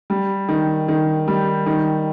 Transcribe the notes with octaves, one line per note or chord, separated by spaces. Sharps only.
G3
D#3
D#3
G3
D#3